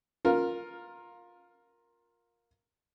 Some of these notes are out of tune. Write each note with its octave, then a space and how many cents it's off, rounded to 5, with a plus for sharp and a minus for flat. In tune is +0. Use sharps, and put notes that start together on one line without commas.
F4 +15 A#4 +0